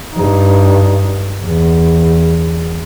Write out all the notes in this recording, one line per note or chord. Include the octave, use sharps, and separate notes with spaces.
G2 D#4
E2